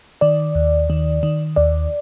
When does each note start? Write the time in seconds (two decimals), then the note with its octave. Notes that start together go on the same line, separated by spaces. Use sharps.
0.21 D#3 D5
0.55 D#2
0.90 D#3
1.23 D#3
1.56 D#2 D5